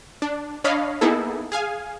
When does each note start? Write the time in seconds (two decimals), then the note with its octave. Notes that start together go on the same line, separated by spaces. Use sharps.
0.22 D4
0.64 D4 C#5 D#5 F5 B5
1.01 A#3 B3 D#4 E4 G#4 A4
1.52 G#4 F5 G#5